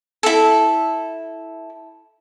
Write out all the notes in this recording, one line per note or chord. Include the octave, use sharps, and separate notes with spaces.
E4 A4